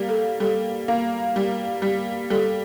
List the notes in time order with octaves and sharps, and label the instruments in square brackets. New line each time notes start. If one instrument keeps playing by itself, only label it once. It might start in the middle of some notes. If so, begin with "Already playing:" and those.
Already playing: [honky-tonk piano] G3 A#3
[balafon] A4
[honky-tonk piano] G3 [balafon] A4
[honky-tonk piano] A#3
G3
G3
[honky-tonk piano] G3 [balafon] A4